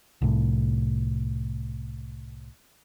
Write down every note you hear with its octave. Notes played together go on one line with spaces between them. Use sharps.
C2 A2